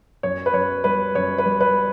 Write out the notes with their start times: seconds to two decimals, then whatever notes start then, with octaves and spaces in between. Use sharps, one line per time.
0.23 F#2 C#5
0.46 B4
0.54 F#2 C#5
0.84 G3 B4
1.15 F#2 C#5
1.38 B4
1.46 G3
1.61 B4